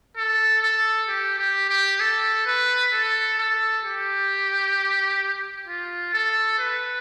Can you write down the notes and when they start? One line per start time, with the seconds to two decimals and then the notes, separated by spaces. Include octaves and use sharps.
0.17 A4
0.62 A4
1.09 G4
1.38 G4
1.69 G4
2.00 A4
2.46 B4
2.93 A4
3.38 A4
3.85 G4
5.68 F4
6.14 A4
6.59 B4